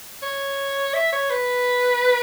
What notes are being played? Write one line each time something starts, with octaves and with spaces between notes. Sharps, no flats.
C#5
E5
C#5
B4